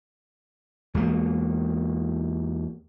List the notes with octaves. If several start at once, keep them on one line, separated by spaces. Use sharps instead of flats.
E2 G#3 A#3